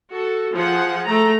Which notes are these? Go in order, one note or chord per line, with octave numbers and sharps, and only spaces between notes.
F#4 A4
F3 G#4 F#5
A3 A#5